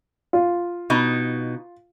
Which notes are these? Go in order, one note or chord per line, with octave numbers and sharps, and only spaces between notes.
F4
B2 D#4